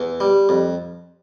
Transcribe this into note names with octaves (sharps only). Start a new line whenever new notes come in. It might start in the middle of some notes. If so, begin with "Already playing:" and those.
Already playing: E2
G3
F2